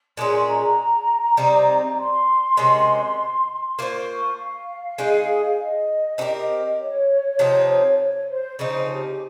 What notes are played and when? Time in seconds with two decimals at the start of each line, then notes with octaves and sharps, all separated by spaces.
0.17 A#2 G#3 C#4 G#4 C6
0.47 A#5
1.37 C3 G3 C4 D#4
1.98 C6
2.57 C3 D#3 G#3 C#4
3.78 A#3 F4 C5 C#6
4.09 C#6
4.38 F5
4.98 G#3 D#4 G#4 D#5
5.58 D#5
6.18 C4 D#4 G4 A#4
6.79 C#5
7.39 C3 F3 C4 D#4
7.99 C#5
8.29 C5
8.59 C#3 F3 C4 D#4 C5
8.89 G4